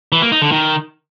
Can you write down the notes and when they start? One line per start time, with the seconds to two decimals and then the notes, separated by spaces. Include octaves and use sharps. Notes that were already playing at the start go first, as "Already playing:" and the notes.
0.12 E3
0.22 A#3
0.32 D#4
0.42 D3
0.52 D#3